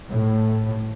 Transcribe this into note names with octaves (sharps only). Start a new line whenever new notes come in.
A2